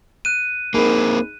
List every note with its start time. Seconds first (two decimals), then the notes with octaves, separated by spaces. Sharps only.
0.25 F#6 D#7
0.74 A#3 C4 D#4 G#4 A#4 B5